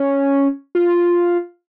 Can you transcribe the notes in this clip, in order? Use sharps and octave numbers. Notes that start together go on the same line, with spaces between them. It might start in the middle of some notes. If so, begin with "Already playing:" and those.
Already playing: C#4
F4